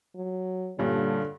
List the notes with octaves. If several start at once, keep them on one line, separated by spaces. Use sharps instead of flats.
F#3
G2 A#2 D3 G3 C#4